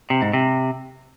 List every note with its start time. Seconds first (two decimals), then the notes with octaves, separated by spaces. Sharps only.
0.10 C3
0.22 G#2
0.33 C3